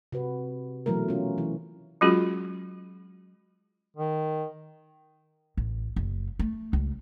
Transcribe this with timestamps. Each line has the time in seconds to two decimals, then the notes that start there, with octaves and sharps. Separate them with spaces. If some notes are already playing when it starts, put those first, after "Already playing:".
0.12 C3 F#4 B4
0.86 B2 E3 F#3 A3 A#4
1.08 C#4 F4
1.38 E3
2.01 F#3 G#3 C#4 F4 F#4 G#4
3.97 D#3
5.57 A1
5.96 F#1
6.39 A3
6.73 C#2